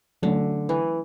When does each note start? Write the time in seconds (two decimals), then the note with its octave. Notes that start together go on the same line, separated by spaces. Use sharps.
0.23 D3 F#3 A3 C#4
0.69 E3